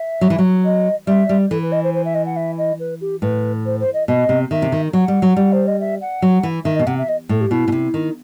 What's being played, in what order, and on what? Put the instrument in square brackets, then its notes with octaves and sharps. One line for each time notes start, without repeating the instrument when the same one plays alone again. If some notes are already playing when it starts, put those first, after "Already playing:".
Already playing: [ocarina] E5
[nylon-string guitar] F#3
E3
F#3
[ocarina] D#5
[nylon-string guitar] G3 [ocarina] E5
[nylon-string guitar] G3
[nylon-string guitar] E3 [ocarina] A4
[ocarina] B4
D#5
C5
C5
E5
D#5
F#5
E5
D#5
B4
G4
[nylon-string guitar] A2 [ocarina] B4
[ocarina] C5
C5
D#5
[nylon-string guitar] B2 [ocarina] D#5
[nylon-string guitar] C3
[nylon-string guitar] D#3 [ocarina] E5
[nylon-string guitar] C3
D#3
[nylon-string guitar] F#3 [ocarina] F#5
[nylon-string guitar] G3
F#3
G3
[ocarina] C5
D#5
E5
F#5
[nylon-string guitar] F#3
E3
[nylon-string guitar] D#3 [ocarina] E5
[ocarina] D#5
[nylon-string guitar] B2
[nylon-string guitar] C3 [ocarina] F#5
[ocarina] E5
D#5
[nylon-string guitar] A2 [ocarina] A4
[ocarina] G4
[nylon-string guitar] B2 [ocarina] E4
[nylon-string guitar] B2
C3
D#3